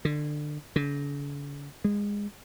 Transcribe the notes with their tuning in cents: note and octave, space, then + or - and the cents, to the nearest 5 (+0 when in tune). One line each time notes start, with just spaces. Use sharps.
D3 +20
D3 -45
G#3 -20